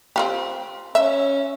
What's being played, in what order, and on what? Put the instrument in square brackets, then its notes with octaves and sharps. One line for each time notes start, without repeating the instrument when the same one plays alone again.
[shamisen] C4 F4 G4
[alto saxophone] C#4 [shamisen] E5